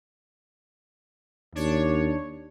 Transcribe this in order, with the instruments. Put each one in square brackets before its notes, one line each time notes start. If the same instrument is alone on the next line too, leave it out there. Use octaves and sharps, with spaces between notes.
[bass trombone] D#2 [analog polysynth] D4 C#5